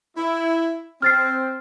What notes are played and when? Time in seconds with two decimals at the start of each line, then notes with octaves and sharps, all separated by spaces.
0.17 E4
1.02 C4 F6 A6 C7